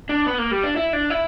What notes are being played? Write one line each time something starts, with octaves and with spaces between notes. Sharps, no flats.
D4
B3
A#3
G3
D4
E4
D4
E4